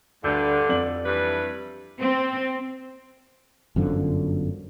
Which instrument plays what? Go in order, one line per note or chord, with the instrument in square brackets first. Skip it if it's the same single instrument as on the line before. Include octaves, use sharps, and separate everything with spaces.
[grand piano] D2 G6 [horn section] G2 D3
[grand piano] F2 D5 F#7
[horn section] G2 E3 B4
[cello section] C4
[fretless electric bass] G1 F#2 D3 F3